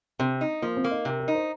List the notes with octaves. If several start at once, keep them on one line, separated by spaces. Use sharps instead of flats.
C3 C4
D#4
F3 A#3
C4
A#3
D#4
C3 A#4
A#4
D#4
C5